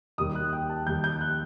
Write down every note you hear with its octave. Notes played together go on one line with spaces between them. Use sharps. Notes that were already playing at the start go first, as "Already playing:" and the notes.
D#2 D#3 G3 D#6
F#6
G5
A5
D#2 D#3 G3 G6
G6
F#6